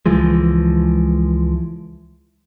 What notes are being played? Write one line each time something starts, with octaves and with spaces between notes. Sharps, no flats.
C#2 E3 F3 G#3